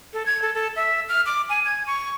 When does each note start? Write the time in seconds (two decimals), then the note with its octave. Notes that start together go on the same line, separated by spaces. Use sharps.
0.13 A4
0.26 G#6
0.42 A4
0.55 A4
0.76 E5
1.09 F6
1.26 D6
1.49 G#5
1.65 G#6
1.87 C#6